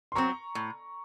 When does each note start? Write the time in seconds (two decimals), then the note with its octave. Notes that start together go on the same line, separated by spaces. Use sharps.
0.12 C6
0.15 F#3 C4 A#5 C#6
0.55 A2